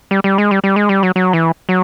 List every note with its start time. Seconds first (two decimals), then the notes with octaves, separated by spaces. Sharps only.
0.11 G3
0.24 G3
0.38 G#3
0.51 G3
0.64 G3
0.76 G#3
0.89 G3
1.03 F#3
1.16 F#3
1.33 E3
1.69 F#3